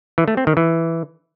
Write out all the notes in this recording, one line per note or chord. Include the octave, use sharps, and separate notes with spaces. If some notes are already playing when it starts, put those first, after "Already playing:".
E3
A3
C4
D#3
E3